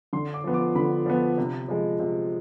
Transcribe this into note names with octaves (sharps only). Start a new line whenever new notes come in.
D3 C6
D6
F3 B3
D6
D3 B5
F3 B3
C3
F3 G#3
C3